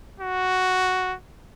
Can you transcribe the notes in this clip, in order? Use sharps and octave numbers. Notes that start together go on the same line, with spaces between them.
F#4